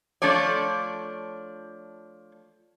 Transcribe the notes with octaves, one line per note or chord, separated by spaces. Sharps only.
F3 A3 D4 C#5 D5